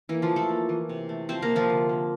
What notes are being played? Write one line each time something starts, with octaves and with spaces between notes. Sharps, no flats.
E3 A#3 E4
F3 F4
E3
A3 A4
A#3
E3
C3
A3
F3 C4 C5
A#3 A#4
C3
F3 F4
D3
A#3